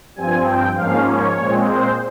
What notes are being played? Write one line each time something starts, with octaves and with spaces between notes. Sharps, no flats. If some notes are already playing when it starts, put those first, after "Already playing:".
G2 F3 C4 G#5
G5
G#2 F3 A#3 C#4 F5
C#5
A#2 G#3 C4
C5